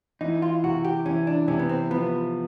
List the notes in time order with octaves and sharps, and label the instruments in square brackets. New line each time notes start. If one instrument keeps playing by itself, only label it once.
[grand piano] E3 [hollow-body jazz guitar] D#4
[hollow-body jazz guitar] F4
[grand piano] C3 [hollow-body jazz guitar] F#4
[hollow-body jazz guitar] G4
[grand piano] E3 [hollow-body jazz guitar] C#4
[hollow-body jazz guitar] D4
[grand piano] C3 [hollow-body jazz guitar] C#4
[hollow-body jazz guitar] B3
C4
[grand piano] F3 [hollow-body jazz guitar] B3